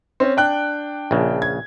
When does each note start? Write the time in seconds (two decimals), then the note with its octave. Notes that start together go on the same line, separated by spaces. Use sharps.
0.20 C4 C#4
0.37 D4 G5 F#6
1.11 A#1 C#3
1.42 G#6